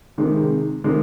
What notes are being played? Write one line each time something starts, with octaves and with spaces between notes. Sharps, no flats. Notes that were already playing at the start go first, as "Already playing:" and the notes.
C3 D#3 G#3
C3 D#3 G#3